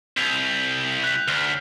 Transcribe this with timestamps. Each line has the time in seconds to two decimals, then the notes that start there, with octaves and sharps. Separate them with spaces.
0.17 C2 G6 B6 F7
1.04 F#6 B6
1.28 D2 F6 C7